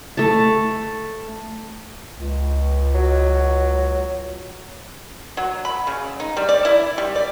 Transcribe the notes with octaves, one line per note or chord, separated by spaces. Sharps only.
A3 A5
C#2
F#3
F#3
B5
C#3
D#4
G3
D5
E4
G3
D5